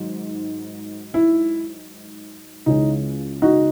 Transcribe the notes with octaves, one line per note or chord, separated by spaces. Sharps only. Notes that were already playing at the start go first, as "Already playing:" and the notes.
Already playing: G#2 D#3 F#3
E4
C#2 C#3 E3 G#3 C#4 D#4
D#4 F#4